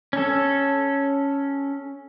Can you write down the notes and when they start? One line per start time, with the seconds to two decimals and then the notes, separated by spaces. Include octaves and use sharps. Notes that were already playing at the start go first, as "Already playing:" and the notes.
0.13 C#4 A4